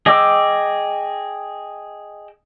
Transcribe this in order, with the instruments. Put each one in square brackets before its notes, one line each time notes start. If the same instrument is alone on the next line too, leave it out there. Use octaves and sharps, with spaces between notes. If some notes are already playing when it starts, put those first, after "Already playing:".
[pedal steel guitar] G#4 D#5 G5 D6 E6